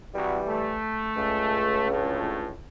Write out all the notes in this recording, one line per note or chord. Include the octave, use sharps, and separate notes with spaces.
C2 E3 G3 F#4
A3
C#2
D2 A2 A3